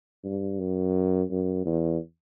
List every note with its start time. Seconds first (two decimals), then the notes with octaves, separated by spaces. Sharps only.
0.24 G2
0.59 F#2
1.31 F#2
1.66 E2